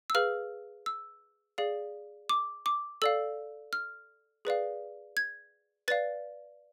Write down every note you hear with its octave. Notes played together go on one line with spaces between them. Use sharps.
E6
G#4 B4 F5 F6
E6
G#4 D5 F5
D6
D6
A4 D5 F5 E6
F6
G#4 B4 D5 F5
G#6
B4 D5 F5 A6